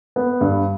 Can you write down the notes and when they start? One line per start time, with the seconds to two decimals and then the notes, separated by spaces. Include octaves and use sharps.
0.16 B3
0.41 G2